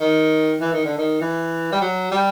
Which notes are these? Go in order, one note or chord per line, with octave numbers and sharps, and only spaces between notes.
D#3
E3
D#3
D3
D#3
E3
G3
F#3
G3